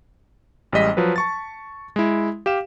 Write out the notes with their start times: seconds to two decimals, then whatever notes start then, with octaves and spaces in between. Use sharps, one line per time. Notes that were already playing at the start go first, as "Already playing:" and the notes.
0.72 A1 G3 G#3 D#5 B6
0.97 F3 F#3 B4
1.16 A5 C#6 A6
1.96 G#3 E4
2.46 G4 F5 E7